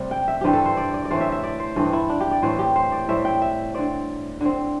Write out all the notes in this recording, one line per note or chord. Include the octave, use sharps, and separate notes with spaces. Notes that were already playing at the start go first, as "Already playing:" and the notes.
Already playing: C3 G3 A3 C4
G5
E5
G2 E3 G3 C4 G4
A4
C5
D5
D5
D5
A2 E3 A3 C4 C5
E5
E5
D5
C5
G2 E3 C4 A4
E4
D4
G4
D5
A2 E3 A3 C4 C5
G4
C5
D5
A2 G3 C4 E5
G5
E5
D3 C4 D5
D3 C4